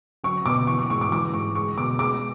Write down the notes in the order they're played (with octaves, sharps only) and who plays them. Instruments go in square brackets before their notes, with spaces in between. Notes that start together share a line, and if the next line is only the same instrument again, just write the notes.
[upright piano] F#3 C#6
B2 D6
E3 C#6
C#6
G#2 C#6
D6
E3 D6
G#2 C#6
G#3 C#6
B2 D6
G#3 D6